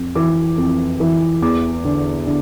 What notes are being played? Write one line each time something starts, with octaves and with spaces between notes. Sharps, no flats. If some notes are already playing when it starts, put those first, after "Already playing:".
Already playing: F2
E3 D6
F2
E3
E2 D6
D3
D3